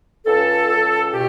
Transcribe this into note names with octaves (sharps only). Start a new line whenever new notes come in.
C#2 A4
C#2
B2 G4